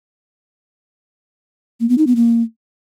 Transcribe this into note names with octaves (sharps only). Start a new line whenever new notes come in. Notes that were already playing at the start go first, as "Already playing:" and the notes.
A#3
B3
D#4
B3
A#3